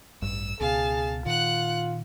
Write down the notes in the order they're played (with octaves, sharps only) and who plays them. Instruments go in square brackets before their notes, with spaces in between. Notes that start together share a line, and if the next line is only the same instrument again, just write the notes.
[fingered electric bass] A1 G2 [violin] E6
[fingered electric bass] C#2 B2 [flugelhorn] G#4 [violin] F5 A5
[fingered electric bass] A#2 D#3 [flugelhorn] F4 [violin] F#5 F#6